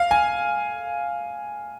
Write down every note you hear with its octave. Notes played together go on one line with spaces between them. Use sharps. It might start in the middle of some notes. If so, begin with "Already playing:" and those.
Already playing: F5
G#5